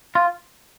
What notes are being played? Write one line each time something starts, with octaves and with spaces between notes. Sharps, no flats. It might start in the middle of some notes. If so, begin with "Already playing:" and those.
F4